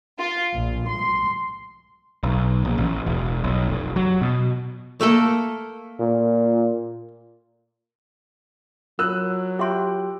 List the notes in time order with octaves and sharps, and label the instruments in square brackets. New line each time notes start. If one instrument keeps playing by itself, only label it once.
[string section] F4
A#1
C6
[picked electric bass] B1
A#1
A1
E1
B1
F1
F#3
B2
[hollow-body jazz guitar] A3 A#3 A4
[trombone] A#2
[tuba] F#3 [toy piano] F4 A#4 [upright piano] E6 F#6
[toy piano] F4 E5 C6 [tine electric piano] G4 G5